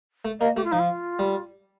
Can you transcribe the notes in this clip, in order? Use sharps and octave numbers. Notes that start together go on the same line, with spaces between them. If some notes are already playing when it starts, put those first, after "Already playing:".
A3
A#3 D#5
A3 G4
F4
F3 D#4
F4
G3